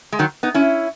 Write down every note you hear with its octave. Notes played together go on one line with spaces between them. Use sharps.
G#3
D#3 F#3
B3 D#4
C#4 E4